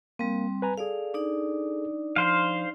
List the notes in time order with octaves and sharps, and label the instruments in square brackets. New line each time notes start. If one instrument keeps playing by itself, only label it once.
[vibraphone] G3 C4 [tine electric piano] A#3
[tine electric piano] B4 G#5 A#5
[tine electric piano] G#4 A4 [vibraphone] D5 F5
[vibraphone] D4 D#4 D5
[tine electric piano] F3 [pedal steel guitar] C5 F5